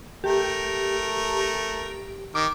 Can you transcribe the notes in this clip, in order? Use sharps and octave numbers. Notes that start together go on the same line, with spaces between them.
A3 G4 A#4
D#3 D6